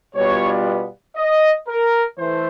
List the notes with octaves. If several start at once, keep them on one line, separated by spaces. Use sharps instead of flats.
B2 G3 B3 D4 F4 C#5
D#5
A#4
E3 A3 C5